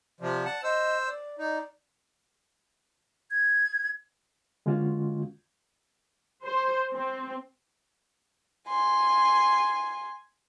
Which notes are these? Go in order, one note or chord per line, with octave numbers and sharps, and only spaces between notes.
C3 F3 D5
F#5 A5
C5 D#5 E6
D5
D#4 D5
G#6
D3 G#3 A#3 C#4 F4 F#4
C5
C4
G#5 C6